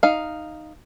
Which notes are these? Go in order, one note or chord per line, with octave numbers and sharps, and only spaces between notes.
D#4 F5